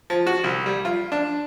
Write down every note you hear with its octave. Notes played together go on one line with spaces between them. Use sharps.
F3
F#4
C2
G3
F4
D4